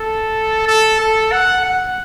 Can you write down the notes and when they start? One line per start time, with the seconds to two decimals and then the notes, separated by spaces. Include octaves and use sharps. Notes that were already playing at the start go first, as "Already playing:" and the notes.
Already playing: A4
0.67 A4
1.00 A4
1.32 F#5
1.66 F#5